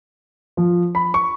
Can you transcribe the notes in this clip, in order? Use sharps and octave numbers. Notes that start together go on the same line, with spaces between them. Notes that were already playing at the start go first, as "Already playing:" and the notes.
F3
B5
C#6